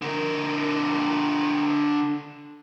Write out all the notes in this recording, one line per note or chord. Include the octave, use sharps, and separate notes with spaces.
D3 A#4